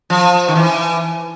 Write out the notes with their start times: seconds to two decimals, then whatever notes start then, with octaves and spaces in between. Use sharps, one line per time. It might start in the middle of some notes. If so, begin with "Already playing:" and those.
0.10 F3
0.48 D#3
0.55 E3